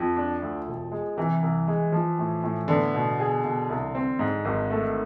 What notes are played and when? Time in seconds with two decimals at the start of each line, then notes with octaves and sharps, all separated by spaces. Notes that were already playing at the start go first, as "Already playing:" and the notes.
Already playing: F2 F3
0.16 D4
0.41 D2
0.67 E1
0.92 G#3
1.17 C3 E3
1.42 C2
1.67 G#3
1.92 F3
2.19 A2
2.43 A2
2.68 D3 B3
2.94 B2
3.19 G#4
3.44 B2
3.69 C2
3.95 C4
4.19 G#2
4.45 G#1
4.71 A3